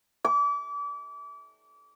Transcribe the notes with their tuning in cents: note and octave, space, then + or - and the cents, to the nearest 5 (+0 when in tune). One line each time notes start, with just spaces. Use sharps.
D6 -35